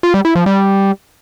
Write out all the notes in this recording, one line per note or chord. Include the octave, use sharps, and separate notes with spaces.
F4
G3
E4
F3
G3